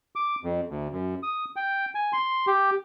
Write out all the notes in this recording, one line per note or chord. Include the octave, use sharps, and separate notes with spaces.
D6
F2
D2
F#2
D#6
G5
G#5
C6
G4